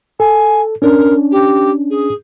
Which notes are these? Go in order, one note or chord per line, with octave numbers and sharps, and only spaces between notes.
A4 G#5
C#4 D4 A#4
G4
G#4